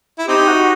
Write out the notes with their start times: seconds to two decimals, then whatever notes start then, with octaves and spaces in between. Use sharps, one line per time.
0.18 E4
0.27 C4 D#4 G4
0.48 F#4